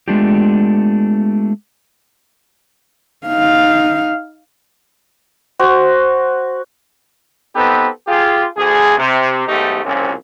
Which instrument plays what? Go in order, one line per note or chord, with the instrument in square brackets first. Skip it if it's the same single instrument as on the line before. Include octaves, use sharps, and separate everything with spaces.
[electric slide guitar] G#3 A3 B3 D4 F4 G4
[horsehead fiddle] D#4 F5
[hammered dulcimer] F#4 C5
[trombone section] B3 C4 D#4 G4 A4 B4
F4 G4 G#4
D2 G#4
C3
B1 G#2 A3 D#4 G4
C2 F2 A#2 C#3 C4 C#4